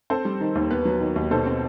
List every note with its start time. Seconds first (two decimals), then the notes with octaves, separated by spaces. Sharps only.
0.10 C4 A4 C5
0.25 G3
0.40 D#3
0.55 D#2
0.71 B3 B4
0.85 F#3
1.00 D#3
1.16 D#2
1.31 B2 A4 C5
1.46 C4